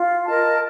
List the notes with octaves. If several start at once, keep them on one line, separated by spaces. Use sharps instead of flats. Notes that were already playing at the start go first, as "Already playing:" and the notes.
Already playing: F4
A#4 D#5 A5